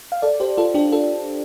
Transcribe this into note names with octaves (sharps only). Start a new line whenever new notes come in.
F5
A4 D5
G4 C5
F4 A4
D4 G4
F4 A4